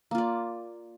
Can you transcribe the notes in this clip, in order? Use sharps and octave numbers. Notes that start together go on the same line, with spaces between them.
A#3 F4 D5